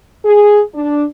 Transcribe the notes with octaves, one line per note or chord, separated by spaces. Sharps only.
G#4
D4